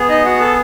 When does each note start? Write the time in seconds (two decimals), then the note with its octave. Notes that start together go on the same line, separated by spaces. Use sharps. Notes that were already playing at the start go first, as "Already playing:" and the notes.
Already playing: B3 G#4
0.09 D#4 D#5
0.25 F#4 F#5
0.40 A4 A5